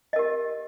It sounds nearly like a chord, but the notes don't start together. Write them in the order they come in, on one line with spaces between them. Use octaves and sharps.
D#5 A#4 G4